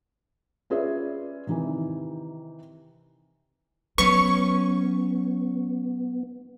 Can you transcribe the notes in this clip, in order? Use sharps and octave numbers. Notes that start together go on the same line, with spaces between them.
C#4 F4 G#4 B4 D5 E5
C3 D#3 E3
F#3 B3 C#4 B4 C#6